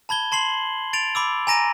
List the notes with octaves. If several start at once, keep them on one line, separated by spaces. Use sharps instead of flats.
A5 B5 G#6 G7
A5 C6 C7 F#7
A6 D7 F7
B5 D6 E6
G#5 A#5 A#6 D#7